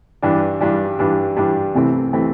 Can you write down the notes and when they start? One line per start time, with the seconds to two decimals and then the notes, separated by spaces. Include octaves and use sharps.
0.22 G2 E3 G3 D4
0.61 G2 E3 G3 D4
0.99 G2 E3 G3 D4
1.37 G2 E3 G3 D4
1.75 C2 C3 E3 A3 C4
2.13 C3 E3 A3 C4